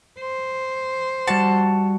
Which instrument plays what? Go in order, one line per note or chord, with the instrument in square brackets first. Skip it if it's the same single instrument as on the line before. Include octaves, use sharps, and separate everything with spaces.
[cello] C5
[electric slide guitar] G3 F#4 F#5 [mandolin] A5